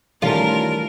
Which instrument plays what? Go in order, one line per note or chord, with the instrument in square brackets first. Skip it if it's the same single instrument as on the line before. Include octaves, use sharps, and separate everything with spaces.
[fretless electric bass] D#3 E3 G3 [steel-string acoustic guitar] A3 C#4 [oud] F4 [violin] A#4